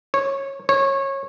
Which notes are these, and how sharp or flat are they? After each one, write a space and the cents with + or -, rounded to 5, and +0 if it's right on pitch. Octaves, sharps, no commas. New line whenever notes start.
C#5 -15
C#5 -20